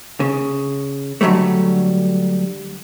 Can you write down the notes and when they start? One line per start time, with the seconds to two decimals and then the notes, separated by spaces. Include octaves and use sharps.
0.20 C#3
1.21 D3 E3 F#3 G3 A3